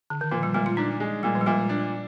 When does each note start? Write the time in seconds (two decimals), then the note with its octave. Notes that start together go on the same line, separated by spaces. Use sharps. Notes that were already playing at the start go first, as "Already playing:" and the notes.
0.10 D3
0.21 D#3
0.31 A#2 F3
0.43 G3
0.54 A#2 G#3
0.66 F4
0.77 D4 D#4
1.00 G#3
1.23 A#2 G3
1.35 F3
1.41 G3
1.46 A#2 G#3
1.69 D4